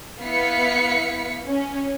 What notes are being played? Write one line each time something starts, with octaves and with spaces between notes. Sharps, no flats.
B3 E4 F5 B6 C#7
C#4